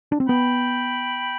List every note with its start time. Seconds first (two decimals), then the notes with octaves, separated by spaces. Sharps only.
0.12 D4
0.20 C4
0.28 B3 G5 B5